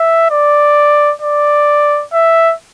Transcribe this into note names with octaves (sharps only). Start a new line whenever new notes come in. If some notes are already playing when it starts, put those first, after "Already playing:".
Already playing: E5
D5
D5
E5